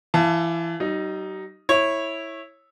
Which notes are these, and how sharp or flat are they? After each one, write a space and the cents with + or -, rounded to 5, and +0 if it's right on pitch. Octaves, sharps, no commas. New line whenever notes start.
E3 +25 F5 +0 A5 +0
G3 -45 D#4 +0
E4 -5 C#5 -15